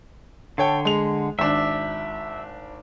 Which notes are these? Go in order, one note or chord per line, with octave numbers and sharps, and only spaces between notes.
D3 A4 C#5 G5
G#3 F7
G#1 D4 E5